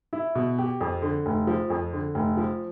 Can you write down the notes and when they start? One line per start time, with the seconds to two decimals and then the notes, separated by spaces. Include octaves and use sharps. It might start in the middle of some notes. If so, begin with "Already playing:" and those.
0.13 E4
0.35 B2
0.59 G4
0.81 F2
1.02 D3
1.26 F1
1.47 F3
1.70 F2
1.93 D3
2.15 F1
2.37 F3